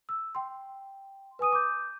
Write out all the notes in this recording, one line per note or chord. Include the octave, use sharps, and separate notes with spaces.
E6
G5 C6
B4 G#5 D#6 D#7
D6 G6